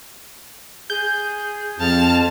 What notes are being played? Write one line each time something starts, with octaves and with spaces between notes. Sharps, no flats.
G#4 G6
F2 A5 F6